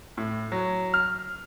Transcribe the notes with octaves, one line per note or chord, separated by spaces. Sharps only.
A2
F#3
F6